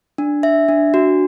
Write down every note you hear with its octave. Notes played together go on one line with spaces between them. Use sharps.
D4
E5
D4
F#4